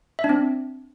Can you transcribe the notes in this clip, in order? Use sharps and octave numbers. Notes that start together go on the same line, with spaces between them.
E5
D4
C4